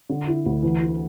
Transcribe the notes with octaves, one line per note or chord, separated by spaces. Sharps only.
D3
E4
D2
E3
E4